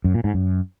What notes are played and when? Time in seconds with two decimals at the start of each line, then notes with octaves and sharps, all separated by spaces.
0.04 F#2
0.14 A#2
0.24 G#2
0.34 F#2